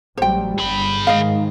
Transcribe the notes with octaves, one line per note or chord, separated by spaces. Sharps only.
A1 F#3 G3 C5 G5
G1 G2 G#4 B5
G#2 D#3 G#3 D#5 F5